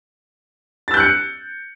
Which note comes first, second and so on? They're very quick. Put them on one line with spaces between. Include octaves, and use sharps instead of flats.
A6 E6 G6 F#6 C#7